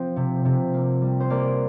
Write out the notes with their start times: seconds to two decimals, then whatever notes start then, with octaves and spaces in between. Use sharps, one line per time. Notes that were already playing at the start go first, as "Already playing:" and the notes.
Already playing: F3 C4
0.16 C3
0.45 C3
0.74 A#3
1.02 G3
1.20 C5
1.30 A#3 D5